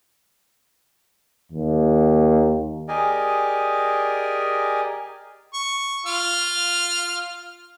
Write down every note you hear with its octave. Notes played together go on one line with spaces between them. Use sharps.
D#2
G4 G#4 A#4 D5 D#5 G#5
C#6
F4 F6